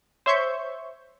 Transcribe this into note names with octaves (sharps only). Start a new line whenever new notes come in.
C5 C#5 E5 C6 C#6 G6